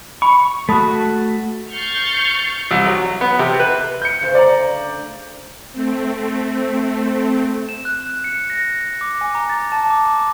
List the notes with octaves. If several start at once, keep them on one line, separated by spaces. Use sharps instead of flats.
B5 C#6
A3 F#4 A5 B5 D#6
C#6 F6 G6 A6 C7 C#7
C2
F#3
B3
C3
B4
G6 C#7
D2 C#3 C5
D5 A#5
A3 C4
E7
F#6
F#6
C#7
A#6
D6
G#5
A#5
A6
A5
D6